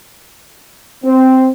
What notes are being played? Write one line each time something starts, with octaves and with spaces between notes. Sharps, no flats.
C4